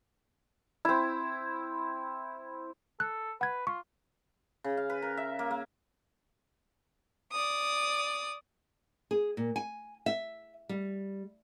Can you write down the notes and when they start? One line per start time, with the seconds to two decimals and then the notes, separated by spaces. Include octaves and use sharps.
0.85 C4 E4
3.00 A4 F#6
3.41 B4 F#5 G#6
3.67 F4 C#6
4.64 C#3
4.77 F5
4.90 B4
5.02 A#4
5.17 E5
5.39 A#3
5.51 A#3
7.32 D5 D#6
9.11 G#4
9.37 A#2
9.56 G#5
10.06 E5
10.69 G3